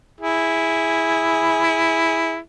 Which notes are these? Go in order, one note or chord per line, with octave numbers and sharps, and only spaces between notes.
E4 G#4